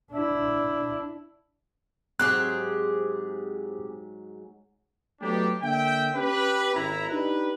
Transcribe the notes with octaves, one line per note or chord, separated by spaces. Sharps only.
D4 E4
G#2 F#3 C4 G4 G#4 F#6
F#3 A3 B3 D4 D#4 G4
D3 A#3 E5 G5
C#4 G4 B4
G#1 E4 A#5
D4 D#4 G4 B4